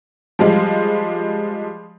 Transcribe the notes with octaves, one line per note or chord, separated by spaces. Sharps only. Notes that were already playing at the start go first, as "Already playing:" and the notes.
F3 G3 G#3